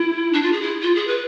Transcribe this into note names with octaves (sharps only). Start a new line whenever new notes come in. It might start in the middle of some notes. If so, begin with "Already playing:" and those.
Already playing: E4
D4
F4
G#4
E4
F4
G#4
B4